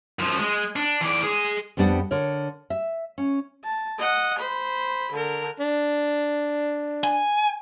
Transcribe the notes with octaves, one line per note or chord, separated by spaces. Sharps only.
F#2 F3
G#3
D4
E3 D5
G#3 G#4
F2 G3 B3 D4 F#5
D3 A#4 C#5
E5
C#4
A5
D#5 F#5
C5 B5
D3 A#4
D4
G#5